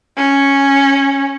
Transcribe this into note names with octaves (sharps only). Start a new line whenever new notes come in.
C#4